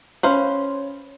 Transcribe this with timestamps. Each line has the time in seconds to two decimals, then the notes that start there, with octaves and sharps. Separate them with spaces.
0.23 C#4 B4 C5 F5